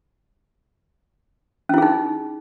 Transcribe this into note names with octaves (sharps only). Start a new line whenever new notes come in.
C#4 D#4 E4 G#4